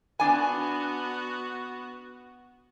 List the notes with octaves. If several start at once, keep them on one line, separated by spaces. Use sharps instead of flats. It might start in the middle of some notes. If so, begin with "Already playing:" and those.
B3 D4 F#4 G#5